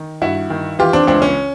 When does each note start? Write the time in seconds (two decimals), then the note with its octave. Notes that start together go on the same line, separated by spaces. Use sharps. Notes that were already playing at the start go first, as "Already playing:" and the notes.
Already playing: D#3
0.22 G2 E4 F#4
0.50 D#3
0.79 E3 F4 G4
0.93 C4 D4
1.07 C#2 C4 D4
1.22 C#4